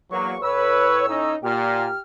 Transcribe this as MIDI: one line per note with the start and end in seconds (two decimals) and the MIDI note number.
0.11 0.37 40
0.11 0.34 54
0.11 0.34 58
0.11 0.37 85
0.42 1.35 45
0.42 1.05 71
0.42 1.05 73
0.42 1.35 88
1.08 1.35 61
1.08 1.35 63
1.43 1.87 46
1.43 1.99 67
1.43 1.99 89